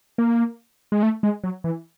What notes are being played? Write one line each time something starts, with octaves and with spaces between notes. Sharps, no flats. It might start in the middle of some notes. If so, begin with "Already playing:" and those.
A#3
G#3
A3
G#3
F#3
E3